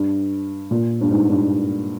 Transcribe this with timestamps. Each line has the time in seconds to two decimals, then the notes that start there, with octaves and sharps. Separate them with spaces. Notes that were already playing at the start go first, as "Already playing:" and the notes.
Already playing: G2
0.71 A#2
1.01 G2
1.10 G#2
1.29 G2